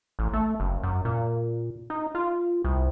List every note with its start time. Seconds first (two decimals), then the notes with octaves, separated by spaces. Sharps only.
0.19 A1
0.33 A3
0.60 F#1
0.83 F#2
1.05 A#2
1.90 D#4
2.15 F4
2.64 C2